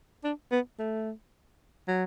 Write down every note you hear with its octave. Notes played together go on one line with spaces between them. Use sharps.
D4
B3
A3
F#3